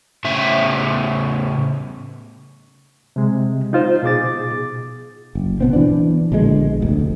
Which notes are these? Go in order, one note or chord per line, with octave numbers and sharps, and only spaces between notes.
A2 C#3 E5
C3 G#3
D#4 F4 C5
B2 G#4 D6 A6
F#1
B2 B3 C4
E3 D4
A#1 B2 D3 G#3
F1 D2